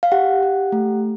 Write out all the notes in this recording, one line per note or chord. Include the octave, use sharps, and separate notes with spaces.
F5
G4 F#5
G4
A3